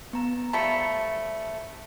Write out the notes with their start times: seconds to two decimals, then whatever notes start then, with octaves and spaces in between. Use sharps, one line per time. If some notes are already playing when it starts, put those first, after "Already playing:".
0.13 B3 A#5
0.53 F3 G3 A3 B5 B6 C#7